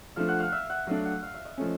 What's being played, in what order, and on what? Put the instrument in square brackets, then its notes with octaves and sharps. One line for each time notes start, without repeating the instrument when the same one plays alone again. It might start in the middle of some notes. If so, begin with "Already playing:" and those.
[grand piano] F3 A3 D4 [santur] F5
[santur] F#5
F5
E5
F#5
[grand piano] F#3 A3 D4 [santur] F5
[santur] F#5
F5
E5
D#5
[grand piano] F3 A3 C#4